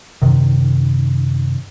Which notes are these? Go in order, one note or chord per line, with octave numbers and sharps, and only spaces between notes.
F#2 C3 D#3